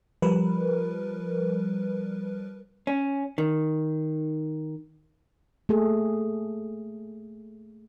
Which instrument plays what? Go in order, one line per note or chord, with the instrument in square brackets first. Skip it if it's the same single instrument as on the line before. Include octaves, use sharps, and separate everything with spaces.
[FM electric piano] F3 G3 A#4 B4
[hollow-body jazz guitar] C#4
D#3
[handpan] A3 A#3 G#4 A4